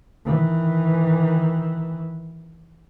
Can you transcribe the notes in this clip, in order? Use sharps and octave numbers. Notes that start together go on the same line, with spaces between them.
D#3 E3